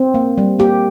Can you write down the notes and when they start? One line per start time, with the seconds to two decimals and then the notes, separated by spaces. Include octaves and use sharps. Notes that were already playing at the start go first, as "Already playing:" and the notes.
Already playing: C4
0.14 A#3
0.38 G3
0.59 A#3 G4